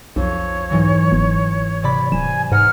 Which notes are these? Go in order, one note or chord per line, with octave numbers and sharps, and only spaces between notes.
B1 F2 C#5
G#2 E3 F#3
G1
C3 D5 B5
D1 G#5 E7
G#2 B4 F#5 A#5 F6